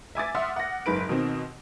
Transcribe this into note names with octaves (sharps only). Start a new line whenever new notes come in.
E5 G#5 D6 A6
E5 F#5 C6 D#6 F6
F#5 A#6
F#1 G#2 B4 D7
B2 D#3 C4